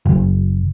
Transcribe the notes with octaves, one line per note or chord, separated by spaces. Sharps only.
F#1